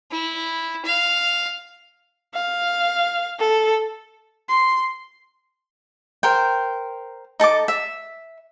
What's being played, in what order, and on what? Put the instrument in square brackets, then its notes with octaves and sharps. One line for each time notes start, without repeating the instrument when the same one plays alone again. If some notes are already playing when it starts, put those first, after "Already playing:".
[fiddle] E4
F5
[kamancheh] F5
A4
C6
[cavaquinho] A#4 C5 G5
D#4 A4 A5 D6
E5